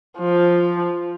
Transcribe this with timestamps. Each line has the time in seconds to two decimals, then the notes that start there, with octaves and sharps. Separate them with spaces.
0.19 F3